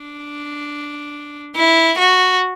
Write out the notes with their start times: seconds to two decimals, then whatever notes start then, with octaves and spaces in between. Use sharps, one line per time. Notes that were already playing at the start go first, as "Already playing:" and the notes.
Already playing: D4
1.56 E4
1.98 F#4